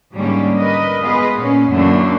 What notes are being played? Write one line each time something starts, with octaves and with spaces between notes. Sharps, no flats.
G#2 D3 G3 A#3 C#4
A#4 B4 D#5
G#3 B3 F4 G#4 B4 D#5
A#2 C#4
F#2 D3 E3 A3 A#3 D4